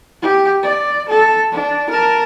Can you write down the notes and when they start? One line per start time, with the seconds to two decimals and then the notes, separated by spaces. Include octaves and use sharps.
0.22 G4
0.63 D5
1.09 A4
1.52 D4
1.90 A#4 A5